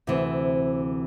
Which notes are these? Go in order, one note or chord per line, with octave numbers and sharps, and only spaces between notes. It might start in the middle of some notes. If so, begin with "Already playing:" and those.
D2 C3 E3 C4